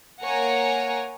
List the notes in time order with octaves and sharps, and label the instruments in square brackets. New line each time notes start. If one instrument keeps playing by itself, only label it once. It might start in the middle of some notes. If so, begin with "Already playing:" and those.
[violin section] A#3 A#4 C#5 F#5 G#5 A#5